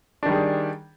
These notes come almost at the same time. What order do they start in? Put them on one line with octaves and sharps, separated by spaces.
D4 D#3 G3 G#4